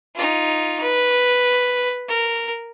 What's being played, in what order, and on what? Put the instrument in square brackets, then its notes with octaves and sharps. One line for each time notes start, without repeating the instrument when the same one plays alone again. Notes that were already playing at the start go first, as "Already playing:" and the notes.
[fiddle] D#4 F4
B4
A#4